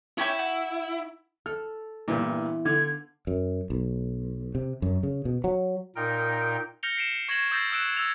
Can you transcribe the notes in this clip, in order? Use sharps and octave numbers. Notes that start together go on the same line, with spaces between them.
C#4 E4 G4 C#5
F#4
A4 F6
G2 A#2 E3 B3 E4
D3 F5 G#6
F#2
B1
C3
F#2
C#3
B2
F#3
A#2 D#4 A#4 G5
F6 G6 A#6 C#7 F7 G7
C7 D7 E7
C#6 G#6 A#6 E7 F#7
D#6 E6 G6 A6 A#6 C7
C#6 D#6 E6 F#6 D7 E7
E6 G#6 F7